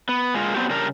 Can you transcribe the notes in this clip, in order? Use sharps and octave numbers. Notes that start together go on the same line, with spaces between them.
B3
G#3 A#3 F4
F#3 B3 C4 D4 F#4 G4
C#3 G3 D4 A#4